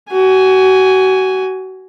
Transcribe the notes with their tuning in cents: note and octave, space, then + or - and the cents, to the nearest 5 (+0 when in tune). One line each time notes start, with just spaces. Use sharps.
F#4 +30 G#5 +0